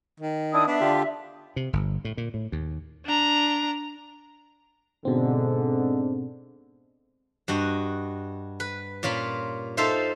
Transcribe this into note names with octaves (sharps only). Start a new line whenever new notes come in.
D#3
D4 E4 D#6
B3 D4 E5
D3 F4 G4
C3
G1
A2
A#2
A2
D#2
D4 A#5
G#2 B2 D3 C4
G2 F#4 D#5
B4
A#2 C#4 F4 A#4 B5
D#4 F4 A4 C5 E5 F5